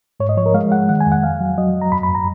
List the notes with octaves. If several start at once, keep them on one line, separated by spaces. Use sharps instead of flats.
G#2 C#5
D#5
F3 C#5
A#4
G#3 F5
G#3 F#5
D#3 F#5
G#5
F2
F#5
F2 F5
F#3
F#3 D#5
F#3
A#5
F#2 B5
B5
F#2
A#5